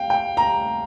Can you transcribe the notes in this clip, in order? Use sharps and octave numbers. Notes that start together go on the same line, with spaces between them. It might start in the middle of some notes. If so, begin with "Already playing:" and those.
Already playing: F5 G5
G5
A#5